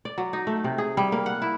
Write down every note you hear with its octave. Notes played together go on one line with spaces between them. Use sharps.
D5
F#3
D#4
A3
C3
G#4
G3
A#3
F#5
E4